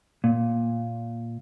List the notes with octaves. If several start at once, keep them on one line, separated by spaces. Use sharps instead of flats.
A#2